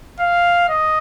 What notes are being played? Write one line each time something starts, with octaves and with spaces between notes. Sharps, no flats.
F5
D#5